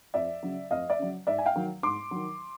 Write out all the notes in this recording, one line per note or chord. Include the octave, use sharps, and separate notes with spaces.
F2 D5 E5
C#3 F#3
F2 D#5 F5
D5 E5
C#3 F#3
G#2 D5 E5
G#5
F5 G5
D#3 F#3
G#2 C6 D6
D#3 F#3